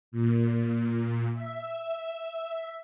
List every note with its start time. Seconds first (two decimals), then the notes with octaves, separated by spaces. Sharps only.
0.12 A#2
1.34 E5